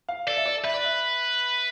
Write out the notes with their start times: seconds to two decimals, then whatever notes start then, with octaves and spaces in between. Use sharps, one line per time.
0.09 F5
0.27 A4 D5
0.37 E5
0.46 D5
0.64 B4 E5
0.74 D5
0.84 E5